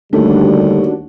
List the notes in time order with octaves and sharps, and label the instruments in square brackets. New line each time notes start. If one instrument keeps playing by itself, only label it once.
[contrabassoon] D#2 [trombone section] D3 G3 [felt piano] A3 [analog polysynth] D4 F#4